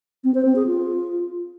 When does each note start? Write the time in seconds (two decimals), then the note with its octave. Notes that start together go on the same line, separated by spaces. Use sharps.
0.24 C4
0.34 C5
0.45 C4
0.56 G#4
0.66 F4